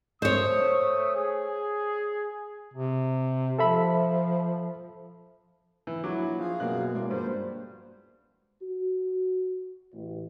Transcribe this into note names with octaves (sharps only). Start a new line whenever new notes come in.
A3 C5 C#5 D#6
G#4
C3
F3 A4 E5 B5
E3
A#1 F#3 E4 F#4 D6
F3 G#4 F5
F#2 B2 A#3 F#4 F#6
A2 G#3 A#3 D5
A#1 G2 B4 C5
F#4
A1